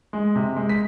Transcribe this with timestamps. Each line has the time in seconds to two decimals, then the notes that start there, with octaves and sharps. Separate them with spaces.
0.13 G#3
0.36 C3
0.56 G#3
0.69 B6